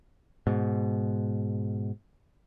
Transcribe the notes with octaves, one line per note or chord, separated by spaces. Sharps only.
G#2 B2